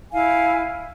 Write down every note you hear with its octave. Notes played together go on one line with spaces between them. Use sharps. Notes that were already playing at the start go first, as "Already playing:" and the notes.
E4 F5 G#5